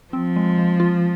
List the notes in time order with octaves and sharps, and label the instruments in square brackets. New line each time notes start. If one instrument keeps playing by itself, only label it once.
[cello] F3 [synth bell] C4
[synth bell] G#3
G#3
F4